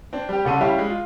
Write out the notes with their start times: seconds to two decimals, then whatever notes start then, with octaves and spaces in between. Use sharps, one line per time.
0.13 C4 D4
0.29 G3 G4
0.45 C2 C#3 A4 F#5 C6 D#7
0.61 G3 C#4 E4 G4 E5 F5
0.78 G#3
0.90 F4